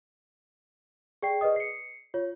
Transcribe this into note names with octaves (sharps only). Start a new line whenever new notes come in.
G#4 D5 G5 C7
G#4 B4 D5 D#5 D#6
C7 C#7
F4 C#5